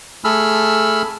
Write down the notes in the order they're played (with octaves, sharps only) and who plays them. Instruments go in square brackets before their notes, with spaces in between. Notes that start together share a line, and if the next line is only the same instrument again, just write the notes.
[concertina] A3 G#4 B5 E6 F6